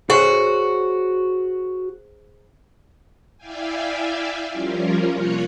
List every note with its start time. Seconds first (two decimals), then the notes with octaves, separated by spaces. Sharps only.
0.10 F#4 G#4 C5 C#5
3.37 E4 D5 E5 F5 G5 G#5
4.51 F3 G3 C#4 F4 A#4
5.11 C3 A#3 F4 C#5 F#6 C#7